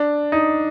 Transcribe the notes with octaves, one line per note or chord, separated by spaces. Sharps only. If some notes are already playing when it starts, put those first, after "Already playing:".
Already playing: D4
D#4